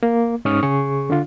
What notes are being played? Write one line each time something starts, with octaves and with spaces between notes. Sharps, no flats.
A#3
G#2 C#4 D#4 C#6 D#6 F6
C#3 G#4 C#6
D3 D4 F4